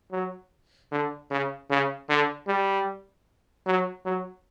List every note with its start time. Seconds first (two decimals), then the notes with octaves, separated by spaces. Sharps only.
0.12 F#3
0.91 D3
1.30 C#3
1.70 C#3
2.09 D3
2.48 G3
3.66 F#3
4.05 F#3